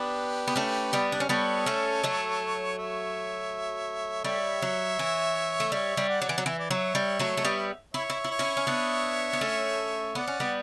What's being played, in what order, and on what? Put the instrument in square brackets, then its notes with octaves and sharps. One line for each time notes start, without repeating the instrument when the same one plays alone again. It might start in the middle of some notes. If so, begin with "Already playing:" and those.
Already playing: [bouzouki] B3 D4 [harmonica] G4 B4
[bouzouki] B3
A3 C#4
G3 B3
D4
C#4
[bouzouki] G3 B3 [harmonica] A4 C#5
[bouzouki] A3 C#4
F#3 A3
[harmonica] C#5 E5
[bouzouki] G3 [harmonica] C#5 E5
[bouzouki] F#3
E3
A3
[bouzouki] G3 [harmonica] C#5 E5
[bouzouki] G3
[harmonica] D5 F#5
[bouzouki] F#3
E3
F#3
[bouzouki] E3 [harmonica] E5
[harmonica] D5
[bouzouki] F#3 [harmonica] C#5 E5
[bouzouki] G3
F#3 A3
A3
G3 B3
[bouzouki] E4 [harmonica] C#5 E5
[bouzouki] E4
E4
[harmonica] C#5 E5
[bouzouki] C#4 E4
C#4
B3 D4
B3
A3 C#4
[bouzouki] B3 [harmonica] D5 F#5
[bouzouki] C#4
G3 B3